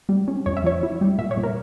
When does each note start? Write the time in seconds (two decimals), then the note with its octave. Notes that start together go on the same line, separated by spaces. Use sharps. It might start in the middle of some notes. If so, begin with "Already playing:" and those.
0.09 G3
0.28 C#4
0.46 F2 C#5
0.57 E5
0.64 F3 C#5
0.83 E4
1.01 G3
1.18 A#2 E5
1.31 C#5
1.37 A#2
1.43 A#4